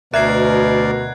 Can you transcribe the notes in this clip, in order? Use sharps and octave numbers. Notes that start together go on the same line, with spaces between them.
D2 B2 A#4 D5 E5 F#6 G#6 C7